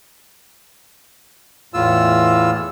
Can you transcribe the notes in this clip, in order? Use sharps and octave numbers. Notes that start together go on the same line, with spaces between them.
E2 A2 F4 E6